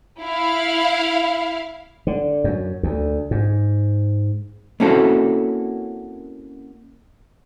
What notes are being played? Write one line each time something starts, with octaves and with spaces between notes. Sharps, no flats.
E4 F5
D3
F#2
D2
G#2
A#3 C4 C#4 E4 F#4 A4